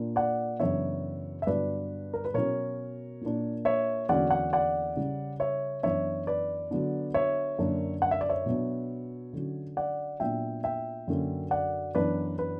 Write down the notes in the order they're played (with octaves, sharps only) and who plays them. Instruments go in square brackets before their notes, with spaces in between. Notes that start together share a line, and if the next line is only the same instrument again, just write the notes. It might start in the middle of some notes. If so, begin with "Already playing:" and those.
Already playing: [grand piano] A#2 A#3 D4
D5 F#5
F#2 C#3 E3 B3 D4 C#5 E5
E5
G2 D3 F#3 B3 D4 B4 D5
A#4
B4
B2 F#3 C#4 A#4 C#5
A#2 A#3 D4
C#5 E5
E2 D3 F#3 A#3 C#4 D5 F#5
D5 F#5
D5 F#5
C#3 G3 C#4
C#5 E5
F#2 E3 B3 D4 C#5 E5
B4 D5
D3 F#3 B3 D4
C#5 E5
F#2 D3 A#3 D4
F#5
E5
D5
C#5 E5
B2 F#3 B3 D4
D3 F#3 C#4
D5 F#5
A#2 F#3 B3 D4 E5 G5
E5 G5
F#2 D3 F#3 A#3 C#4
D5 F#5
F#2 E3 B3 D4 B4 D5
B4